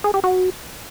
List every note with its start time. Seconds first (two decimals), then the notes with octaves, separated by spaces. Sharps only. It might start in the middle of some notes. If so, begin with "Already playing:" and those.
0.04 G#4
0.14 G4
0.24 F#4